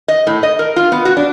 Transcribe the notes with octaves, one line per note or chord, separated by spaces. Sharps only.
D#5
A2
D#5
A#4
F4
B3
F#4
D4